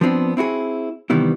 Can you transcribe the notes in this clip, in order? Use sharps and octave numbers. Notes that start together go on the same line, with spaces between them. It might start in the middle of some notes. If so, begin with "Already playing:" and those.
F3 B3 C4 D4
C4 E4 F#4 G#4
C3 D#3 E3 G3 B3 E4